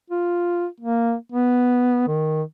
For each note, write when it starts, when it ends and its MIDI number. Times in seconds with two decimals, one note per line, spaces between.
0.10 0.66 65
0.80 1.14 58
1.32 2.07 59
2.08 2.42 51